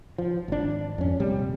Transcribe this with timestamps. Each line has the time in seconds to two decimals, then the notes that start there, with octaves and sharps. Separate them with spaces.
0.18 F3
0.48 G#1 D4
0.98 F2 C#4
1.20 D#1 C3 G3